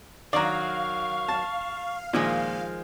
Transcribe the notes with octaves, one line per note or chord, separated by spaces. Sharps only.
D#3 F#3 D5 F5 A#5 C#6
A5
A#2 D#3 F3 G#3